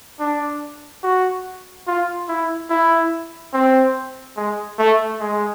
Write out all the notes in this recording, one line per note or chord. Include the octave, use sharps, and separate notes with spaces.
D4
F#4
F4
E4
E4
C4
G#3
A3
G#3